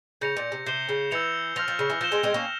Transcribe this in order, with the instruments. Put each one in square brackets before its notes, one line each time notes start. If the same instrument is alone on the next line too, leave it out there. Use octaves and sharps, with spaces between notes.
[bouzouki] C#3 [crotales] G6 A#6 C#7 F7
[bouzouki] A#2
C3
[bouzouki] C3 [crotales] G6 C7 E7 G7
[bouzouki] C#3
[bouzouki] E3 [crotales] E6 G6 C#7 F7
[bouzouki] F3 [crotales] F6 A#6 F7
[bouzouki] F3
C#3
E3
[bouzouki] F3 [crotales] G6 A#6 E7 G7
[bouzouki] G#3 C4
G#3 C4
A#3 C#4